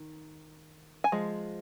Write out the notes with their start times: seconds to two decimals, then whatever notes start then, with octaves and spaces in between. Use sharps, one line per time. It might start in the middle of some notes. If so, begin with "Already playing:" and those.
Already playing: D#3
1.04 G#5
1.12 F3 G#3